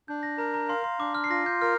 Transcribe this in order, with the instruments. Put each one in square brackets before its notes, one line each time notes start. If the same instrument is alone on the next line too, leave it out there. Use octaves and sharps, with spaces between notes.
[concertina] D4 [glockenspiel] G6
[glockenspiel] A#6
[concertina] A#4 [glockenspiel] A#5
[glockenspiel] A#5
[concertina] F5 [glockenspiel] C6
[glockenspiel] C6
[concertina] D4 [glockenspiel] D6
[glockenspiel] F6
C7
[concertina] F4 [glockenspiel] A#6
[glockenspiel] G6
[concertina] A#4 [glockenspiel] F6